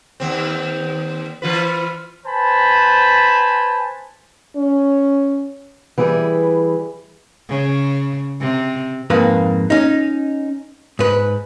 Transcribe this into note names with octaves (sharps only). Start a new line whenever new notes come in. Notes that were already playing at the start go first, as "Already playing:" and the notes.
D#2 C4
E3 F4 B4
B4 C5 G#5 A5 B5
C#4
E3 G3 E4 G#4 B4
C#3
C3
F2 G#2 A#3 B4
C#4 D#4
G#2 B4